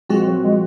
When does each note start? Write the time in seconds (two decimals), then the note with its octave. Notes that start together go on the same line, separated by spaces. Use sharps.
0.09 A#2 F3 G#3 C4 F#4
0.26 F#3
0.44 G#3